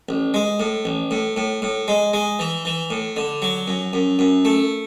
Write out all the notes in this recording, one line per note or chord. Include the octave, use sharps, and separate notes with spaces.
A1
G#3
A2
A1
A2
A2
A2
G#3
G#3
E3
E3
A2
D3
F#3
F#2
F#2
F#2
A3